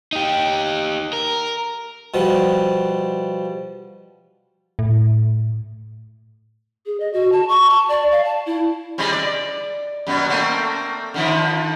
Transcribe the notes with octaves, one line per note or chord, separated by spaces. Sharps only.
D#4 G4
A#4
B2 F3 G3
A2
G#4
D#5
F#4
A5
C#6
A5
D5
F5
A5
E4
C3 G3 G#3
D5
F#2 B2 B3
A3 A#3 C4
D3 D#3 F3